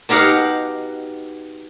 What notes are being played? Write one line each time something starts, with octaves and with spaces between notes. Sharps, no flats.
B2 D#4 G4 F5 F#5